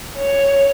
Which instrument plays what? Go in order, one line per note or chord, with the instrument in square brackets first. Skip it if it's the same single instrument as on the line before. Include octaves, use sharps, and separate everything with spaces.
[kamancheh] C#5